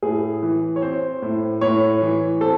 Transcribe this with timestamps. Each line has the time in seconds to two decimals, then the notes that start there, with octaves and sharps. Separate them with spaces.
0.03 A2 G#4
0.43 E3
0.76 C#5
0.82 C4 C5
1.22 A2
1.61 A2 C#5
2.02 E3
2.41 C4 A4